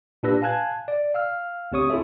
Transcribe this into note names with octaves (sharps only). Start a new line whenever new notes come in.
A#2 D4 G4 B4 E6 A#6
F5 G#5 A5 F#6 G#6
D5
F5 E6 F6
D2 C4 G4 C#5 C#6 D#6
E4 F4 G#4 A4 E5